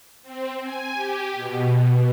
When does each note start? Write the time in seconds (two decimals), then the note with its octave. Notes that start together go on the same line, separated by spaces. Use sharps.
0.23 C4
0.62 G#5
0.93 G4
1.33 B2